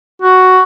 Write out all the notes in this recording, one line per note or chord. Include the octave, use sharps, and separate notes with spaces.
F#4